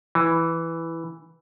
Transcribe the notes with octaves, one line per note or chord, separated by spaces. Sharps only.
E3